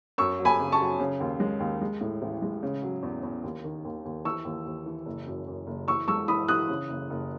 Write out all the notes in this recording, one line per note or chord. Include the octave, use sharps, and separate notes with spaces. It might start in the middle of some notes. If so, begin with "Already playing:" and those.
F#2 C#6 E6
F#3
G#5 B5
C#3
A5 C#6
F#3
C#3
D#2
G#3
D#2
G#3
A2
A1
G#3
C#3
F#3
E2
E2
D#2
D#3
D#2
D#2
E3 C#6 E6
D#2
D#2
E3
F#1
F#2
F#2
F#1
E3 C#6 E6
G#3 C#6 E6
E3 B5 D#6
E3 D#6 F#6
C#3
F#1
F#1